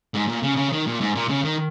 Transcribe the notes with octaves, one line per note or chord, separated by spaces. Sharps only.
G#2
A#2
C#3
C#3
D#3
A#2
G#2
A#2
C#3
D#3